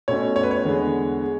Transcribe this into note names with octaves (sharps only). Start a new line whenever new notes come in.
B2 A3 C#4 C#5
C#5
B4
C#5
E2 D3 G#3 B3
G#3